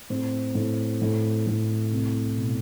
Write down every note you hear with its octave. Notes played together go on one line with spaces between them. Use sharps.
A2 C4
A2
A2
A2
C2
B2